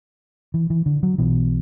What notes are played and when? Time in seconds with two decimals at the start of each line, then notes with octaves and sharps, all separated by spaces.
0.54 E3
0.70 E3
0.86 D3
1.03 F#3
1.18 B1 B2 E3